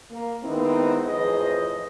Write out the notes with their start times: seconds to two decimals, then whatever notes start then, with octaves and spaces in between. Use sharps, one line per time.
0.11 A#3
0.43 D#3 G#3 B3 C4 D#4 E4
1.05 F2 A2 E3 G#4 C5 D#5